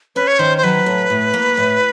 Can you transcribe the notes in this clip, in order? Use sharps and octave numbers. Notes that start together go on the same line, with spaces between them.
C#4 B4
C#5
D#3 C5
C5
F#3 B4
A2
A2
A#3
A2